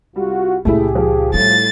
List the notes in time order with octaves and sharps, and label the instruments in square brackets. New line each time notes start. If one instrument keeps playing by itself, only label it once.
[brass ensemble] C2 F4 F#4 [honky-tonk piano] G3
[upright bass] C#2 A#2 [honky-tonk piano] A3 E4 [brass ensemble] G4 G#4
[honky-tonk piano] F3
[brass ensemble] A2 [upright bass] G3 [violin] A6